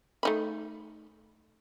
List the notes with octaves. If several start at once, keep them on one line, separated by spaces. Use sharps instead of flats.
A3 D#4 B5